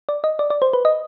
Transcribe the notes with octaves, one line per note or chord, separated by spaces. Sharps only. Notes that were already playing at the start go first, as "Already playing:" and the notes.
D5
D#5
D5
D5
C5
B4
D#5